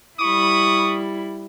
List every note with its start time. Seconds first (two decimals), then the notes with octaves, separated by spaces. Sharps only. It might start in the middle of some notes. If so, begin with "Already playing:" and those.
0.20 G3 E4 B5 C#6 D#6